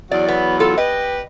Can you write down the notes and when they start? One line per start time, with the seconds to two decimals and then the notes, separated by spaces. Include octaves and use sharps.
0.11 E2 F#3 D5
0.28 B3
0.60 F4 A4
0.78 G4 B4 D#5